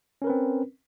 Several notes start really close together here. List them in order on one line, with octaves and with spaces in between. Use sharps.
C#4 A#4 B4 C4